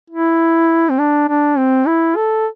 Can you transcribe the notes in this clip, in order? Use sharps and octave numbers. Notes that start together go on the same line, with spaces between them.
E4
C4
D4
D4
C4
E4
A4